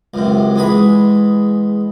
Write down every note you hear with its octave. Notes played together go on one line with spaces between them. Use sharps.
C#2 F#2 C3
E2 G#3 G#4 B5